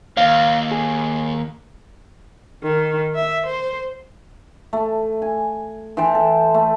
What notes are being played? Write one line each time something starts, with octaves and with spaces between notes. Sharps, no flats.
D#2 F5
G#4
D#3
E5
C5
A3
G#5
E3 C5 G5 A5
A4
A3